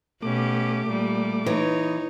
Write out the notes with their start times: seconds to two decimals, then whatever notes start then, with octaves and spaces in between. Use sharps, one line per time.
0.22 B2 A3 C#4 G4 D6
0.87 A#2 G3
1.46 E3 D#4 C#5